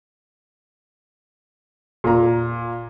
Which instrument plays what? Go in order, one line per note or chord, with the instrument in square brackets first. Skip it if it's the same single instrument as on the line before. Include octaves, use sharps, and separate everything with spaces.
[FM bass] E1 [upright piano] A#2 A#5